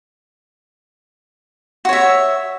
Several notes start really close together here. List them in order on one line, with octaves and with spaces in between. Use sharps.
F#4 C#5 E5